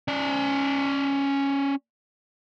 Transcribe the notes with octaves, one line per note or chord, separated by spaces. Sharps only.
C#4 D5